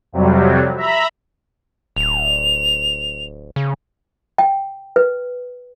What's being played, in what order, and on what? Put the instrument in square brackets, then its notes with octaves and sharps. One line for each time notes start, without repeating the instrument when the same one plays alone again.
[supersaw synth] F2 C3 F#3 G3
E5 A#5 B5
[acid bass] D1 [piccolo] F7
[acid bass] C#3
[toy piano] G5
B4